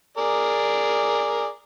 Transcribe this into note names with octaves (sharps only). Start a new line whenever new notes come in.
G#4 A#4 D5